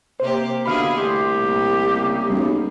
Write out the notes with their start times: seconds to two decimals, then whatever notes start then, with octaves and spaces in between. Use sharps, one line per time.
0.20 C3 A#3 G4 C5
0.65 B2 D3 E4 G#4 F5 B5
0.97 C2 A3 G4 C6
1.35 A#2
1.88 C#3 A#3
2.30 B1 G3 C#4